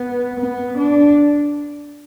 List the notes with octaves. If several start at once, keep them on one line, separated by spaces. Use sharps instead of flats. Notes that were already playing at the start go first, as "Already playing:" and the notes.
Already playing: B3
B3
D4